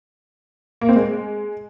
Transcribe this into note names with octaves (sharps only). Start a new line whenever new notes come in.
A#3
C4
G#3